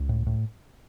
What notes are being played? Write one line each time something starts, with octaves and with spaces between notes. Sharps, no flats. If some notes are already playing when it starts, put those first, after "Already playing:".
Already playing: C#2
A2
A2